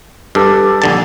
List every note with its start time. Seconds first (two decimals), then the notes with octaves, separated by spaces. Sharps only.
0.35 G2 G4 A4 D5
0.82 A#1 D3 A5